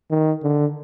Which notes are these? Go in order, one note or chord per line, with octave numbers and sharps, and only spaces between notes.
D#3
D3